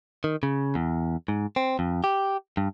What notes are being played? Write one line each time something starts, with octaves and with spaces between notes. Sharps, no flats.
D#3
C#3
E2
G#2
C4
F2
G4
G2